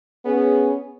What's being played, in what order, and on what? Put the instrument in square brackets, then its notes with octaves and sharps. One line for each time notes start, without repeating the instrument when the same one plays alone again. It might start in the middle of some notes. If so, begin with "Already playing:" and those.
[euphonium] B3 [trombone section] C#4 G#4